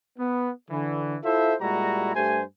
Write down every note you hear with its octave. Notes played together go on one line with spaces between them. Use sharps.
B3
D3 E3
E4 F4 A4 C5 E5
A#2 G3 G#3 E4 F#4 A#5
G2 A3 G4 C5 G#5